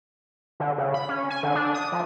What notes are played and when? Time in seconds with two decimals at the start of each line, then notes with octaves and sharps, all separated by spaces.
0.60 D3
0.78 C#3
0.94 B5
1.09 C#4
1.30 G#5
1.43 D3
1.55 D4
1.74 D#6
1.92 F3